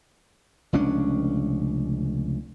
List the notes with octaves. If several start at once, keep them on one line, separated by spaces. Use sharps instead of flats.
F1 C#2 C#4 D4